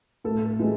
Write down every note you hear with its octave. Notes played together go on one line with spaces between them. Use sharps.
A2 A4
E3 G#3